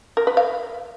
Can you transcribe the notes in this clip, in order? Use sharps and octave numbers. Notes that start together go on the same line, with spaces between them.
A#4
B4
F5